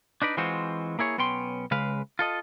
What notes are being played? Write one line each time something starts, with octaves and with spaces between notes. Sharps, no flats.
D4 D#4 B4 D5
E3 G#3 C4 F4 F#4 C5
A#3 E4 G#4 C#5
B1 B3 C#4 G5 C6
C#2 C#3 G#3 B4 F5
F4 A4 D#5